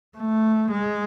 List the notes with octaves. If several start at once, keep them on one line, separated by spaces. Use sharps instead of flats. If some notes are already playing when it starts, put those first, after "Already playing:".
A3
G#3